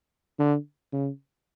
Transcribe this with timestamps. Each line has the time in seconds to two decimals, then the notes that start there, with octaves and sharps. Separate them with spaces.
0.39 D3
0.93 C#3